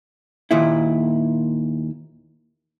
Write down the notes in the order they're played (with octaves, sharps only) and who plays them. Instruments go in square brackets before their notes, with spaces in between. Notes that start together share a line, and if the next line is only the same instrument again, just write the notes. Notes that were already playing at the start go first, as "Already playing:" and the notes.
[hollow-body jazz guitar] D#2 A#2 E4